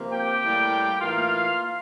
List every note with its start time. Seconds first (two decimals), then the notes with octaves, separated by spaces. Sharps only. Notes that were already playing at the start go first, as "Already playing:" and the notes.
Already playing: C3 F3 A#3
0.13 G4 G5
0.43 A2 G3 A#3
1.00 A2 E3 A#3 F4 F5